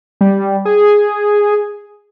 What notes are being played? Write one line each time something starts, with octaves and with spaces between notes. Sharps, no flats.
G3
G#4